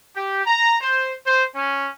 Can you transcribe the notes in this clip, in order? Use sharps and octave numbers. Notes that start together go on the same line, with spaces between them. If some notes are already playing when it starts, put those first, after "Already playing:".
G4
A#5
C5
C5
C#4